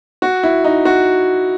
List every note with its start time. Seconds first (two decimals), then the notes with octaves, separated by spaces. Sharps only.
0.22 F#4
0.43 E4
0.64 D#4
0.85 F#4